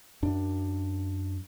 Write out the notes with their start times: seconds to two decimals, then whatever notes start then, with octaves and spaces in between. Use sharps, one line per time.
0.22 F#2 D4